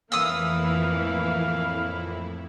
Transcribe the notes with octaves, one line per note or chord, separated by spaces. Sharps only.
F2 A2 E3 A#3 E4 F5 D#6 E6